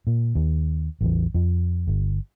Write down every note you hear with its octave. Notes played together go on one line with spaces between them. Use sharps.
A#2
D#2
A1 E2
F2 F3
G1